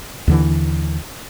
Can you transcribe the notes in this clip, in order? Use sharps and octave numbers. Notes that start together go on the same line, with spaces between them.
D#2 D3 E3